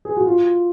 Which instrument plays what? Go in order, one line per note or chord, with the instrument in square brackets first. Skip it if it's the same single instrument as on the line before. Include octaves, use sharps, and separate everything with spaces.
[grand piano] G#4
F#4
F4